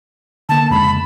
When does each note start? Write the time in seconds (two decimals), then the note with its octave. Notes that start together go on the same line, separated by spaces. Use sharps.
0.49 D3 A#3 A5
0.71 F2 C#3 G#3 B5